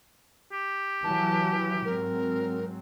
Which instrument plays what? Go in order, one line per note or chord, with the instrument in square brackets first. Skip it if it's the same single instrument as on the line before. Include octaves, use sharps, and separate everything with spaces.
[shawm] G4
[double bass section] E3 F#3 [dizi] A5
[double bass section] G#2 F#3 C4 [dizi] A#4